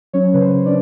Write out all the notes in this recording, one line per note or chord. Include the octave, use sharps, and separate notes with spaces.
F#3 C#4 C#5
C#3 B4
C5
C#3
D4 D5